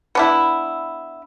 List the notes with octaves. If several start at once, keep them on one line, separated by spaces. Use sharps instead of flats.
B3 D4 E4